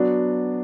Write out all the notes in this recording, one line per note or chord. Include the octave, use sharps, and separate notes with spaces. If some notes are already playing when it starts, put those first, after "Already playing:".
Already playing: F#3 B3 D4 F#4